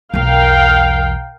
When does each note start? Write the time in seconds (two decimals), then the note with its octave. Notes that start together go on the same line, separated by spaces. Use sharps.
0.14 B1 E2 A#4 F5 G5